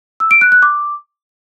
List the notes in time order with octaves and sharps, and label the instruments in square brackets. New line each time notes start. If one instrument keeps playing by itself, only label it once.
[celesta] E6
D7
F#6
F#6
D6